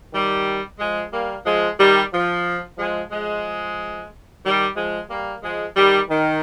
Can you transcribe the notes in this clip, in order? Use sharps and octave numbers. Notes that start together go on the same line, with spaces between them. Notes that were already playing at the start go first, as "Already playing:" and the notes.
D#3 G3
F3 G#3
G3 A#3
F3 G#3
D#3 G3
F3
F3 G#3
F3 G#3
D#3 G3
F3 G#3
G3 A#3
F3 G#3
D#3 G3
D#3